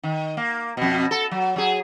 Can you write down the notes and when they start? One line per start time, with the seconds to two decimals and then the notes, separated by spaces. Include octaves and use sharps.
0.03 D#3
0.37 A#3
0.77 F2 B2
1.11 A4
1.31 F#3
1.56 F#3 G#4